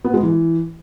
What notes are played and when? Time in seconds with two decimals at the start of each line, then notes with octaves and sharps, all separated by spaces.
0.04 B3
0.14 G#3
0.23 E3